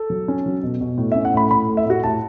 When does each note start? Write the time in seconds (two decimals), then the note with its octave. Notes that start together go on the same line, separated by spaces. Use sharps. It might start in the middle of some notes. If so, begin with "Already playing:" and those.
Already playing: A4
0.10 F#3
0.28 C#4
0.46 F#3
0.63 B2
0.81 B2
0.98 A2
1.12 C#4 E5
1.25 F#5
1.34 A2 B5
1.51 A2 B5
1.69 A3
1.77 E5
1.86 A2 F#4
2.04 A2 A5